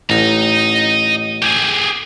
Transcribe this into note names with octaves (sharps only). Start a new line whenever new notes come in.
A1 D#5 A#5
G4 G#4